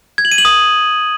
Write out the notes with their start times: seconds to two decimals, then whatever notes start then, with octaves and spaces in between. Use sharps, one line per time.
0.18 G#6
0.25 F#7
0.32 D#7
0.38 F#7
0.45 D#6